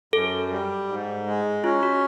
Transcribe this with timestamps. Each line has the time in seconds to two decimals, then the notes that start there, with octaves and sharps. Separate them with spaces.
0.13 F#2 A4
0.50 G3
0.88 G#2
1.26 G#3
1.64 C#4 F4
1.83 F#4